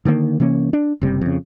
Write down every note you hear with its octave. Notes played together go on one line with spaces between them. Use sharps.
D3 D#3 G3 A#3
C3 E3 A#3 C#4
D4
F#1 C3 G3
F2 C#3